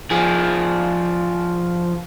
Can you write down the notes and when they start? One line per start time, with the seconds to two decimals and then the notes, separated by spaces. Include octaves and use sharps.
0.11 F3 G#4